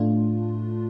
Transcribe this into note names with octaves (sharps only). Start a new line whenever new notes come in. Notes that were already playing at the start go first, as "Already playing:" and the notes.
Already playing: A2 A3 D4 F4